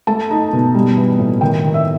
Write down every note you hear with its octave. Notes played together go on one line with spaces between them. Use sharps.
A3 A5
D#4
B2
G3
E3
A2
D#3 G5
D#3
E5